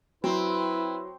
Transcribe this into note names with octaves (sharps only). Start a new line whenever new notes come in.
F#3 C4 E4 B4